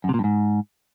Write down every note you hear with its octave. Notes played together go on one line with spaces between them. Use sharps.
F#2
C3
A#2
G2
G#2